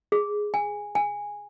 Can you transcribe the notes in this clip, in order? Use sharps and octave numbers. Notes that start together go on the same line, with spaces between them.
G#4
G#5
G#5